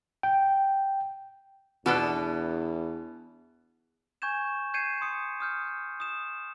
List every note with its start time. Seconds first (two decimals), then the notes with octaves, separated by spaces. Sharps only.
0.23 G5
1.86 E2 B2 B3 D4 A4
4.22 G#5 C#6 G6 G#6 E7
4.74 G6 G#6 C7 C#7 D#7 E7
5.01 C6 D#6 C#7
5.40 D#6 F6 G6
6.00 D#6 E7